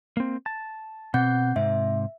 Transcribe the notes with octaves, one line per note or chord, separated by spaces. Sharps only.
A#3 C4
A5
B2 C4 F#5 G6
G#2 C3 E5